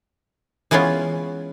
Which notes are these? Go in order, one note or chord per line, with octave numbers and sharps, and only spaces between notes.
E3 G#3 B3 C#4 F4